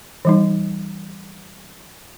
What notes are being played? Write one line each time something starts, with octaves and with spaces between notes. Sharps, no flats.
E3 G3 D#4